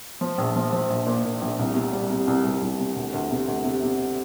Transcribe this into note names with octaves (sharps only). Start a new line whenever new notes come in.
F3
A#1
F3
F3
A#1
A#2
A#2
A#1
C2
C3
G3
C3
C2
C2
C2
C3
D2
D2
C3
D2
C3
C3